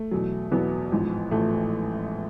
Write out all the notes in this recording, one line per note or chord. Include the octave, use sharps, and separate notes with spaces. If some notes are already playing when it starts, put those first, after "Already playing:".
Already playing: A3
E2 B2 F#3
E2 B2 F#3 B3
A1 G#2 F3
A1 F3 A3